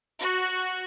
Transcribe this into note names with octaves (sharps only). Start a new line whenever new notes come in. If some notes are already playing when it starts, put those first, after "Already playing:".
F#4